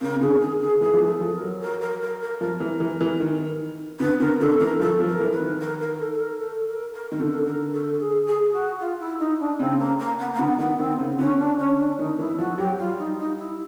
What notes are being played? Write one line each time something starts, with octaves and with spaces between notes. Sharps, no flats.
C#3 A#4
C#3
D3 G#4
D#3 G#4
G#4
E3 G#4
F3
E3
A4
F3
A#4
F#3
A#4
A#4
A#4
A#4
F3 A#4
E3
E3
E3
D#3
D3 B4
D3 A#4
D3 A4
E3 A#4
F3 A4
F3
A#4
E3
B4
D#3
A#4
A#4
A4
A#4
A4
A#4
A#4
D#3 A#4
D3 A4
A#4
A4
G#4
G#4
F#4
F4
E4
D#4
D4
C#3 C4
A#3
A#3
B3
A#3
D3 B3
D#3 B3
D#3 C4
C#3
D3 C#4
D4
C#4
D4
D#3 D#4
E3 E4
F3 F#4
F#3 G4
G3 F4
D#4
D#4
E4